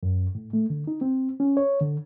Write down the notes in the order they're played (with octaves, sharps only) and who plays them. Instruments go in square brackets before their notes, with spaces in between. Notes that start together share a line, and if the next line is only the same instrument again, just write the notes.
[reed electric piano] F#2
A2
A3
D3
D#4
C4
C#4
C#5
D3